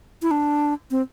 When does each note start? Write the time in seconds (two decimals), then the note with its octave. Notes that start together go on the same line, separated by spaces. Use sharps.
0.22 E4
0.31 D4
0.91 C4